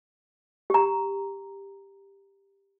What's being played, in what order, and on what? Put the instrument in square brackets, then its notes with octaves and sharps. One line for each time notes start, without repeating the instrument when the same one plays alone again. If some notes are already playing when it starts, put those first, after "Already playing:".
[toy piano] G4 A#5